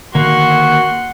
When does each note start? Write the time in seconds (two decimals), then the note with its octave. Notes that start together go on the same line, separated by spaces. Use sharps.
0.15 D3 D#3 A#3 F#4 F#5 C6